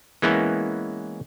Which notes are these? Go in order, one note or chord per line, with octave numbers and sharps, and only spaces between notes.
E3 G#3 A#3 B3 C#4 E4